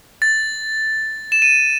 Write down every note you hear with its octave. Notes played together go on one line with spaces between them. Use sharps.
A6
E7
D#7